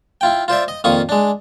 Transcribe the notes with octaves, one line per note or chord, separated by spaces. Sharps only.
E4 F4 G5
F4 C5 D5 E5
D#5
F2 A#2 D#3 F4 C#6 D#6
G#3 D4